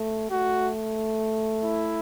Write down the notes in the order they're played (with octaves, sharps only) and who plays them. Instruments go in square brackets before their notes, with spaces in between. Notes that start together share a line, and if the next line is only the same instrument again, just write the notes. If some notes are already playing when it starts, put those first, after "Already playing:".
Already playing: [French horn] A3
[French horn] A3 [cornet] F#4
[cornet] E4